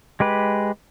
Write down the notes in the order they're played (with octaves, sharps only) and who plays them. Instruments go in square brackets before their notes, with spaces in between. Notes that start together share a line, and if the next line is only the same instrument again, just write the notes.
[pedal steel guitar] G#3 G4 B4